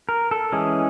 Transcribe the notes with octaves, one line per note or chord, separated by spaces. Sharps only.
A#4
A4
E3 G#3 C#4 G#4